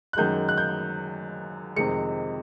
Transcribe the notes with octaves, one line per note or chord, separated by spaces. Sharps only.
F#6
F#2 D#3 G#3 G6
F#6
G6
F2 C3 D#3 G#3 C#7